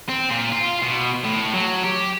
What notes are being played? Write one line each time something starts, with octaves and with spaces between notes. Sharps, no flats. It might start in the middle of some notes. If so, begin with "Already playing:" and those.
C4
A#2
F4
B2
A2
F#3
G4